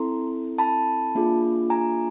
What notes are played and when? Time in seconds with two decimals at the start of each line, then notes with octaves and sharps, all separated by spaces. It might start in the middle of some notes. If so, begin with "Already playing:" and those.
Already playing: C4 E4 A4 A#5 C6
0.58 A5 B5
1.15 A#3 D4 F4 G#4
1.70 G#5 A#5